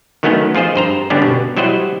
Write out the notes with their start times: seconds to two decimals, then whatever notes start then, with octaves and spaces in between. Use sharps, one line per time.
0.23 D#3 F#3 A3 B3 C#4 D#4
0.55 F3 F4 G#4 C5 D#5
0.76 G2 C5 A#5
1.10 G2 D3 G3 B3 C#4 D4
1.22 B2
1.57 F#3 G3 E4 C5 D#5 F#5